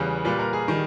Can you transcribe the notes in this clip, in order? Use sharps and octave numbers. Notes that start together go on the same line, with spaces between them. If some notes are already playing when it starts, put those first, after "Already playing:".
Already playing: E2 C#3 G3 B4
A#2 G3 B4
A#4
G#4
D#3 G3